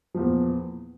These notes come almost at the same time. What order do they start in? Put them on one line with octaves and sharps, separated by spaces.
F3 E2 A#2